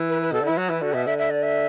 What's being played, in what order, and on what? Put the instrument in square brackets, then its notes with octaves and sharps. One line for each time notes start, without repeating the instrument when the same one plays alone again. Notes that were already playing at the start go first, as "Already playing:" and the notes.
Already playing: [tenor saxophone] E3
[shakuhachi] B4
B4
[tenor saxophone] B2 [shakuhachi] A4
[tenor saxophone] D3
[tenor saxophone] E3 [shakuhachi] E4
[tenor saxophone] F#3 [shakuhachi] F#4
[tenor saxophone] E3 [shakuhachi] E4
[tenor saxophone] D3 [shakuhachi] F#4
[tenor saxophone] B2 [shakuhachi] E5
[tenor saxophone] D3 [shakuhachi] E5
[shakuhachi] E5
D5
E5